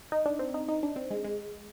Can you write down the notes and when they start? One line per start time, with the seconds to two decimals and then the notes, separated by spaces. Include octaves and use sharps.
0.12 D#4
0.26 D4
0.39 C4
0.54 D#4
0.68 D#4
0.83 D4
0.96 C4
1.10 G#3
1.24 G#3